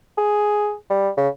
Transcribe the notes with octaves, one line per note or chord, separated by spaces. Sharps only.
G#4
G3
C#3